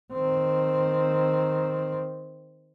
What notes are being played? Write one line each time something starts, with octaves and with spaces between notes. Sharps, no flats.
D#3 C4